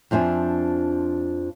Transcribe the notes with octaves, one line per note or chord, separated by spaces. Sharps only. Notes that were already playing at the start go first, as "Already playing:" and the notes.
F2 F3 D4 E5 G#5